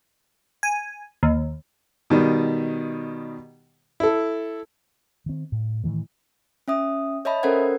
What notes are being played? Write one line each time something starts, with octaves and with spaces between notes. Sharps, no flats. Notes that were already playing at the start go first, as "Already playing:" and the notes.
G#5
D#2
B2 D#3 G3
E4 A4
D#3 C4
A2
A2 D#3 E3 A3
C#4 E5 D#6
C#5 D#5 E5 A5 B5
C#4 A4 A#4 C5 F#5 G#6